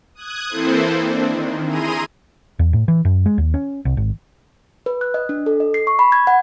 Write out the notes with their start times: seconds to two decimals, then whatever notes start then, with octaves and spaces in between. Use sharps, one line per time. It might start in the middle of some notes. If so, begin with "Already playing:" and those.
0.15 D#6 F#6 G#6
0.49 E3 A#3 C4 E4 A4 C5
1.01 C4 D4
1.30 D#3
1.65 E4 G#4 A#5 C6 D#7
2.59 E2
2.73 A2
2.88 E3
3.05 F#2
3.26 G#3
3.38 D#2
3.54 C#4
3.85 C2
3.97 G#1
4.86 B4
5.01 F#6
5.14 D#5
5.29 D4
5.46 A4
5.60 D#5
5.74 C7
5.87 C#6
5.99 B5
6.12 G#6
6.27 F#5